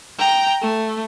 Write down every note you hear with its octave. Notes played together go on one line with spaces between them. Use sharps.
G5 A#5
A3